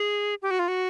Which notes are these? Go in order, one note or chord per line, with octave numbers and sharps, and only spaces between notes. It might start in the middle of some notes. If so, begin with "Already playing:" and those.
Already playing: G#4
G4
F#4
F4
F#4